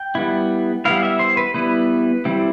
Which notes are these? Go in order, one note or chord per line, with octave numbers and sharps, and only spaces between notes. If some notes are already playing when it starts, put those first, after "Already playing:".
Already playing: G5
G3 B3 E4
G3 B3 E4 F5
E5
C5
B4
G3 B3 E4 B4
G3 C4 E4